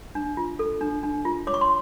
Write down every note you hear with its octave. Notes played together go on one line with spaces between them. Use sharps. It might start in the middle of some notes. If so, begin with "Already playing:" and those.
D4
F4
A4
D4
D4
F4
C#5 D6
C#6
C6